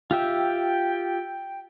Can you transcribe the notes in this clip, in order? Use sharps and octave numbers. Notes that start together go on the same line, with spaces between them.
F4 G4 E5 G5